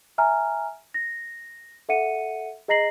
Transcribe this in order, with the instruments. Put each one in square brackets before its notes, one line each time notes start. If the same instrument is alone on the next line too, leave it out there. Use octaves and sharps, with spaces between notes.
[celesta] E5 G#5 A#5 F6
A#6
A4 E5 F#5 C#7 D#7
G#4 D#5 A#5 A#6 C7 F#7